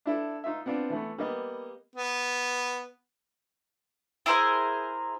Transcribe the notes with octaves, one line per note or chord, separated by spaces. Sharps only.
D4 E4 A4
D#4 F4 E5
B3 C4 D4 F4
E3 A3 B3
G3 A#3 B3 D#5
B3
E4 G#4 A#4 C5